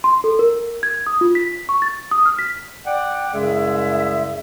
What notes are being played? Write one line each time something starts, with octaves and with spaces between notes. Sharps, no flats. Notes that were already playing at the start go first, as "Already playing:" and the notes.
C6
A4
A#4
G#6
D#6
F4
B6
C#6
A6
D#6
F6
B6
D5 F#5 G5
C2 F#2 C#3 G#3 G#4 E5